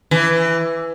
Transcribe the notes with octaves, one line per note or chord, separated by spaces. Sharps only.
E3